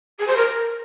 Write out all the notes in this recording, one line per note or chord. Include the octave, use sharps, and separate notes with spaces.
G#4
C5
A#4